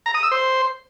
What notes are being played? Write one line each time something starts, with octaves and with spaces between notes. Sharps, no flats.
A#5
D#6
E6
C5